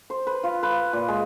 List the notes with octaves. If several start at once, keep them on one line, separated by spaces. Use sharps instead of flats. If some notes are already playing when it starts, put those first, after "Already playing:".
C5
B4
F4
B4
A#2
G#3